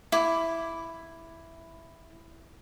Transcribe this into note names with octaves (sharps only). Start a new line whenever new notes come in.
E4 D6